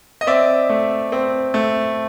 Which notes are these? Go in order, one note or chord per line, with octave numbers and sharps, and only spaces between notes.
D#5
C4 D5 E5
A3
C4
A3